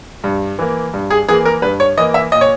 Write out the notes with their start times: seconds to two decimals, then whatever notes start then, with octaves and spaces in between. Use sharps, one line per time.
0.24 G2
0.59 E3 A#3
0.94 G2
1.10 G#4
1.28 E3 A#3 G#4
1.45 A#4
1.62 G2 B4
1.80 C#5
1.98 E3 A#3 D#5
2.14 E5
2.32 A#2 D#5
2.41 C#5